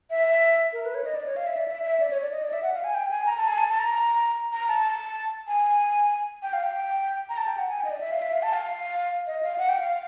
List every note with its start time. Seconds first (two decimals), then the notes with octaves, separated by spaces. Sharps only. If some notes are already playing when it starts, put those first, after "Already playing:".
0.10 E5
0.73 A#4
0.84 B4
0.95 C#5
1.05 D#5
1.15 D5
1.26 C#5
1.36 F5
1.47 E5
1.57 D5
1.68 E5
1.84 E5
2.00 D5
2.10 C#5
2.21 D5
2.32 D#5
2.42 D5
2.53 E5
2.63 F#5
2.74 F5
2.84 G#5
2.94 G5
3.11 G#5
3.26 A#5
3.37 A5
3.48 G#5
3.58 A5
3.69 A5
3.79 A#5
4.53 A#5
4.68 A5
5.47 G#5
6.43 G5
6.53 F5
6.63 G5
7.29 A#5
7.37 A5
7.47 G5
7.58 F#5
7.69 G#5
7.80 G5
7.85 D#5
7.90 D5
8.01 E5
8.11 F5
8.22 E5
8.33 F5
8.43 A5
8.53 F5
8.64 F5
9.27 D#5
9.43 F5
9.58 F#5
9.69 G5
9.80 F5